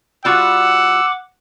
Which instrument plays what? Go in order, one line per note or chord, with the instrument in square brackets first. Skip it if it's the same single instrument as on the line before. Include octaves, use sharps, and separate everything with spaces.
[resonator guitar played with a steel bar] G3 F4 F#4 [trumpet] F#5 [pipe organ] D6 [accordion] E6